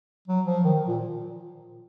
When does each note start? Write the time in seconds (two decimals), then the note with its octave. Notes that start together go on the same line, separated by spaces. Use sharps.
0.28 F#3
0.46 F3
0.64 D#3
0.88 A#2